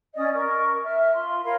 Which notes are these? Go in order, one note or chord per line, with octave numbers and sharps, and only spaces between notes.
C#4 D5 D#5 D#6
A#4 C#6
E5 F6
F4 C6
A#4 C#5 F5 B5